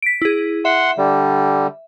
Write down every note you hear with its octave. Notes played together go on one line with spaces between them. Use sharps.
B6 D7
E4 G#4
E5 F#5 C6
D3 G3